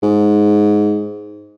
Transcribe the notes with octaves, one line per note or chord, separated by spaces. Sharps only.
G#2